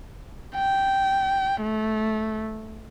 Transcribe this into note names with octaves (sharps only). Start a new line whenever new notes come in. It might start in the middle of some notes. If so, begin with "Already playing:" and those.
G5
A3